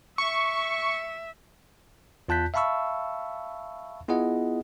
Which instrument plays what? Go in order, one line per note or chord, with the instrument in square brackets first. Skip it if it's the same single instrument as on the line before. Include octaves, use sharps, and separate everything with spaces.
[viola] E5 [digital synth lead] C#6
[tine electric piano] E2 F4 A5 F#6 G6 B6
E5 F5 A5 B5 C#6 E6
B3 E4 F4 G#4 D#5 F#5